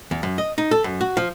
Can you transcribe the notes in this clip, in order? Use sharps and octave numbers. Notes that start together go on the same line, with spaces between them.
E2
F#2
D#5
D#4
A4
F#2
F#4
F3